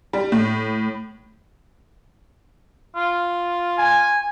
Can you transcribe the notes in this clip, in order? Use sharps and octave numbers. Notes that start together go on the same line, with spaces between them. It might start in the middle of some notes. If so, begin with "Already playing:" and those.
G3
A2
F4
G#5